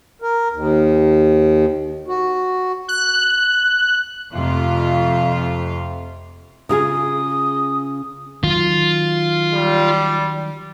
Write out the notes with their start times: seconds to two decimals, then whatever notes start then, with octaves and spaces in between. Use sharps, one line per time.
0.22 A#4
0.52 D#2
2.08 F#4
2.88 F#6
4.32 F2 C3 A3 F4 F5
6.69 C#3 F4 G#4 D#6
8.44 D#3 F#3 F4
9.54 G3